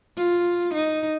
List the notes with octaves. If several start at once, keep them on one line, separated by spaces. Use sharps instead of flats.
F4
D#4